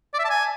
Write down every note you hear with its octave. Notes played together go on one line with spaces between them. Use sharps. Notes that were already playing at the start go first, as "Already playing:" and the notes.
D5
E5
A5
G#5